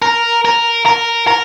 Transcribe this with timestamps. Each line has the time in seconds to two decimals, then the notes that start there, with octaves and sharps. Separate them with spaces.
0.02 A#4
0.45 A#4
0.86 A#4
1.27 A#4